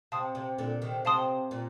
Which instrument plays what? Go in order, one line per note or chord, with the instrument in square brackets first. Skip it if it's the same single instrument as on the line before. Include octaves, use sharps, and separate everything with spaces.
[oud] C3 [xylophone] F5 A5 C6 D#6
[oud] C3
A#2 D3
C3 D#3
[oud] C3 [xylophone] F5 A5 C6 D#6
[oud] A#2